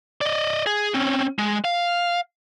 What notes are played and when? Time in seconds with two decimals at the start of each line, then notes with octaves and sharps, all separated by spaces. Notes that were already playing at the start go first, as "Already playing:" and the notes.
0.21 D5 D#5
0.67 G#4
0.94 C4 C#4
1.39 G#3
1.65 F5